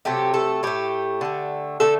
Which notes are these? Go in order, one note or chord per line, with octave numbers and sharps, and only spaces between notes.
C3 F#3 A3 G4
A4
A2 A3 G4
D3 A3
D3 A3 A4